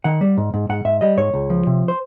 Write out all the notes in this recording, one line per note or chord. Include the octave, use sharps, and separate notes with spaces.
D#3 F#5
G3
G#2
G#2
G#2 F#5
G#2 E5
G3 D#5
G#2 C#5
C#2
F3
C3
C5